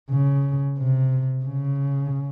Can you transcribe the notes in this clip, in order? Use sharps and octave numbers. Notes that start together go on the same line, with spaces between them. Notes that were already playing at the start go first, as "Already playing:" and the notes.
C#3
C3
C#3